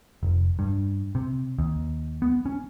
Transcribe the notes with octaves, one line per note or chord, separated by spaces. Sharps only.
F1
G2
C3
D#2
B3
C#4